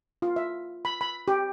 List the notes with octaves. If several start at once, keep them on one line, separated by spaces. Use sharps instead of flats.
F4
E5
B5
B5
G4